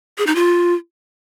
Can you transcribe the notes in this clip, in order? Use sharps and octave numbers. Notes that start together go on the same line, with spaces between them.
G#4
D#4
F4